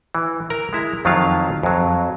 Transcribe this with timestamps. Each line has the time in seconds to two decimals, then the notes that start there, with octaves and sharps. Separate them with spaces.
0.15 E3
0.50 A#4 A#5
0.73 G#3 E4 A#5
1.05 F2 D#3 F#3 D#4 F4 F5
1.63 F2 F#3